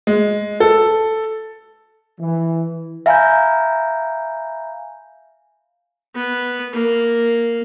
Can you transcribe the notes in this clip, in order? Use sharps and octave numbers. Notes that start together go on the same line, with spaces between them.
G#3
A4
E3
E5 F5 G#5 A#5 B5 G6
B3
A#3